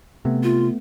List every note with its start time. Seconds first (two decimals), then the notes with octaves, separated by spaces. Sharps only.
0.25 C3 A3 B3
0.43 F4